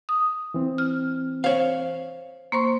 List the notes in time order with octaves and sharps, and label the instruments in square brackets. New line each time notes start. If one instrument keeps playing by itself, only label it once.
[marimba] D#6
[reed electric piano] E3 C4
[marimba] F6
[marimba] C5 [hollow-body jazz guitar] C#5 F5
[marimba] A#3 C5 C#6 [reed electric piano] C6